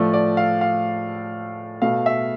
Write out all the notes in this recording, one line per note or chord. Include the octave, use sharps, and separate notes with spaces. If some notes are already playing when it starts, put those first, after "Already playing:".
Already playing: A2 F3 A3 D5
D5
F5
F5
B2 A3 F5
E5